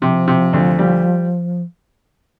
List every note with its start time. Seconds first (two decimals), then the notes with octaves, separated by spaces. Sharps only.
0.01 C3 F3
0.27 C3
0.53 D2
0.79 G3